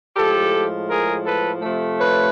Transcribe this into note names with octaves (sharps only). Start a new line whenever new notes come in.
A2 F3 G#3 G4 A4
G#4 A#4
A4 B4
C3 F3 A3
B4 C#5